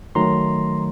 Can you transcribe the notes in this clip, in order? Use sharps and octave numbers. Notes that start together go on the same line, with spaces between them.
D#3 F#3 A3 A#5 C6